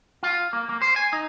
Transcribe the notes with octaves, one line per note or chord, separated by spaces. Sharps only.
F4
A#3
A#3
C5
G#5
D#4